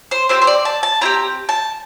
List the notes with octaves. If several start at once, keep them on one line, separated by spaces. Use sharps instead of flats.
C5
C4 E4 G4 C5
C5
D5
A5
A5
C4 E4 G4 A#5
A5